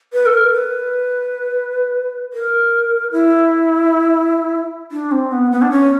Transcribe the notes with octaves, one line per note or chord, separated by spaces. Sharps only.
B4
A4
A#4
B4
A#4
E4
D4
C4
B3
B3
D4
C#4